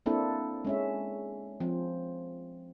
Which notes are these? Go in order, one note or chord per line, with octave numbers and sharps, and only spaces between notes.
A#3 C4 D4 E4 A4
G#3 C#4 E5
F3 C4